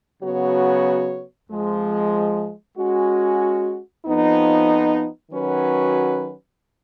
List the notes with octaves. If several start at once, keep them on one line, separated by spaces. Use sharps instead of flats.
C#3 F#3 B3 F#4 C#5
F2 F3 G#3
G#3 C#4 F#4
F2 F3 B3 D#4
D#3 F#3 C#4 F#4 B4